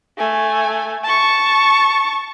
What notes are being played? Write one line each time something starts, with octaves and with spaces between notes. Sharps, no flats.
A3 G#5
A5 C#6